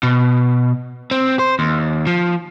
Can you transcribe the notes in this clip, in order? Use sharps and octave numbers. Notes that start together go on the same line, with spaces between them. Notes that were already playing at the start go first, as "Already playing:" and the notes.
B2
C4
C5
D#2
F3